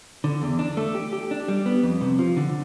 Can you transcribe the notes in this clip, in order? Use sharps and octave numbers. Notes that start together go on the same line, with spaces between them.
D3
E2
D4
A3
G4
G4
D4
G3
B3
F2
C3
F3
D3